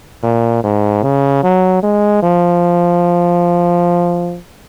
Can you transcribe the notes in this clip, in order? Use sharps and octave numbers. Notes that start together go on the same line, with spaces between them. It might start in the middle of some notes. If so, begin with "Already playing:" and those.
A#2
G#2
C#3
F#3
G#3
F3